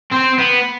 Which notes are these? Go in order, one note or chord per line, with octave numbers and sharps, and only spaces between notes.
C4
B3